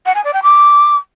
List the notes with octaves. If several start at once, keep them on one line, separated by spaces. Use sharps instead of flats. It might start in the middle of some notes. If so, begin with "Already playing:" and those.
F#5
G#5
D5
G5
D6